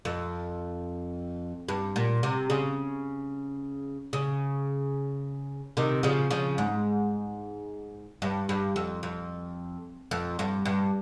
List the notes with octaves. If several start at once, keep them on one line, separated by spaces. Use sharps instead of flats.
F2
G2
A#2
C3
C#3
C#3
C3 D#3
C#3 F3
C#3 F3
G#2
G2
G2
F2
F2
F2
G2
G2